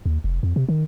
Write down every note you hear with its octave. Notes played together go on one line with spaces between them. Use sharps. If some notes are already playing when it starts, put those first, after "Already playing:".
D#2
F1
F2
C3
D#3